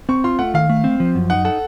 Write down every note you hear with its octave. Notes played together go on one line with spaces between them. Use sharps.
C4 C#6
F4 C6
A3 F#5
D#3 F5
A3
C4
F3
F#2
D#4 F#5
A4 F#5